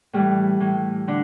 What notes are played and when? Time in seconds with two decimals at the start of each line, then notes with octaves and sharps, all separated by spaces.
0.13 A2 E3 G3
0.60 A2 E3
1.08 D3 D4